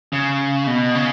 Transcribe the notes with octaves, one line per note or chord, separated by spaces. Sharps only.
C#3
B2
C#3